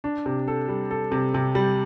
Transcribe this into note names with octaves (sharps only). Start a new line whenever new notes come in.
D4
C3
A4
G3
A4
C3
C3
G3